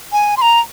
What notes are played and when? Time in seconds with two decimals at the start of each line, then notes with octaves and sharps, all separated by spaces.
0.12 G#5
0.37 C6
0.42 A#5